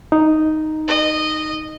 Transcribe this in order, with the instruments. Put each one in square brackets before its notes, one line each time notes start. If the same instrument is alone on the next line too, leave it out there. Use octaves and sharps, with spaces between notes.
[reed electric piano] D#4
[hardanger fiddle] D#5